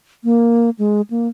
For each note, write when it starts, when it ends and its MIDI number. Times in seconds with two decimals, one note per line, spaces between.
0.24 0.70 58
0.79 1.01 56
1.10 1.28 58